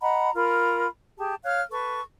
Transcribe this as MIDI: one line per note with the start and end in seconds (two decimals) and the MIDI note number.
0.01 0.31 75
0.01 0.31 78
0.01 0.31 82
0.01 0.31 83
0.35 0.87 65
0.35 0.87 70
0.35 0.87 83
1.18 1.34 67
1.18 1.34 68
1.18 1.34 81
1.43 1.61 73
1.43 1.61 77
1.43 1.61 89
1.43 1.61 90
1.71 2.01 69
1.71 2.01 71
1.71 2.01 85